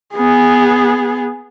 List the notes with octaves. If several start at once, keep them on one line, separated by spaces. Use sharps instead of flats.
B3 G#4